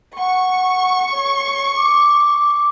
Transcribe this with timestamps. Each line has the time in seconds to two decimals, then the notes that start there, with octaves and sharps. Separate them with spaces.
0.18 F#5 C#6
1.12 C#5
1.76 D6